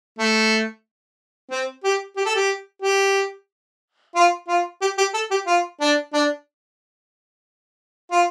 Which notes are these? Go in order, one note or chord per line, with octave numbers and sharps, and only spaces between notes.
A3
C4
G4
G4
A4
G4
G4
F4
F4
G4
G4
A4
G4
F4
D4
D4
F4